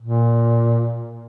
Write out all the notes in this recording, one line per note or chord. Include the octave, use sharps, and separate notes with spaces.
A#2